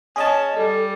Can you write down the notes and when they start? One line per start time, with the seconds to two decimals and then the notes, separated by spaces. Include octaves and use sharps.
0.16 C#4 G#4 D#5 A5
0.56 G3 A4